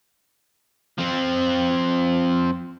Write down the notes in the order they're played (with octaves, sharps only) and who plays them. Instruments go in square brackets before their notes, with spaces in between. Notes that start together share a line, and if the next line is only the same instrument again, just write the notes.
[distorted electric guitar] F3 C4